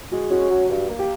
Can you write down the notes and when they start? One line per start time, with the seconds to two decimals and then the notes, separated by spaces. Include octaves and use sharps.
0.10 G#3 F#4
0.30 C#4 F#4
0.50 F#3
0.70 G2
0.89 A#3
0.99 G4